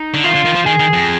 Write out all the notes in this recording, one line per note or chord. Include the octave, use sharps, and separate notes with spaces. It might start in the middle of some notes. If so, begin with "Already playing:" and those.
Already playing: D#4
D3
D#3 F4
D3
D#3
F3
D#3 G#4
D#3
F2